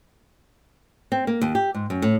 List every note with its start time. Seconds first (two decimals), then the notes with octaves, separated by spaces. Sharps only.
1.12 C4
1.27 A#3
1.42 D#2
1.55 G4
1.75 G#2
1.90 F#2
2.02 A2